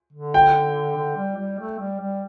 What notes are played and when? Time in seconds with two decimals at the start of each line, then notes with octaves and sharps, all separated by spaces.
0.13 D3
0.34 G5
0.96 D3
1.17 G3
1.37 G3
1.59 A3
1.79 G3
2.00 G3